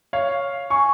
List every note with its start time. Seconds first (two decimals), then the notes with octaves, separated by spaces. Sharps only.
0.13 C#5 F5
0.70 G#5 C#6